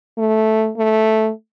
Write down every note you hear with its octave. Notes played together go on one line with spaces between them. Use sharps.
A3
A3